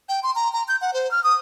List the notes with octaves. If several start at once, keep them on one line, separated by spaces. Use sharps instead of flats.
G5
C6
A#5
A#5
G6
F#5
C5
F6
D#6